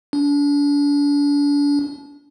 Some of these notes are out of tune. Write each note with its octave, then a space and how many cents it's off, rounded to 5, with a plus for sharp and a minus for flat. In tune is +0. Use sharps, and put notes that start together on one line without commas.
D4 -35